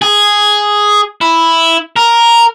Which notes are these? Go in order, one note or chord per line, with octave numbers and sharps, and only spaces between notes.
G#4
E4
A#4